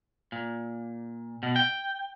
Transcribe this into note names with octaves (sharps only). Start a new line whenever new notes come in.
A#2
B2
G5